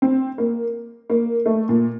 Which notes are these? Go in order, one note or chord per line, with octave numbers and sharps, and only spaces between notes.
C4
A#3
A#3
A3
A#2